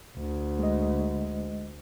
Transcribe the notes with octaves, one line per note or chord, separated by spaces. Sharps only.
D2
G#3 D#5